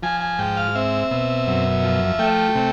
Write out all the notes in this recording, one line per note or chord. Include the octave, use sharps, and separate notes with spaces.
F3 G#5
G#5
G#2 G5
F5
C4 E5
B2
F#2
F3
A3 G5
C3